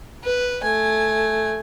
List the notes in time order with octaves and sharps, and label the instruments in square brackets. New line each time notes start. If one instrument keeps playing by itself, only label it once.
[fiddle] B4
A3 G#5